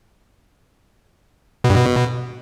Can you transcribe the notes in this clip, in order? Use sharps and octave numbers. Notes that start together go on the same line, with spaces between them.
B2
G2
B2